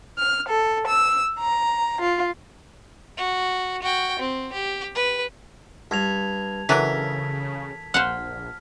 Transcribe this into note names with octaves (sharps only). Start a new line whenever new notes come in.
F6
A4
E6
A#5
F4
F#4
F#4 G5
C4
G4
B4
G2 A5 G#6 F7
C#3 E3 F#3 D4 A4 A#4 B6
A#1 C5 F5 F#5 F6